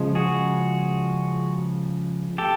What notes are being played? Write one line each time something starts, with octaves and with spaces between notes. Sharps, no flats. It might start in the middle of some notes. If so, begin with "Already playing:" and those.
Already playing: C#3 F3 G#3
F#4 G#4
G4 A4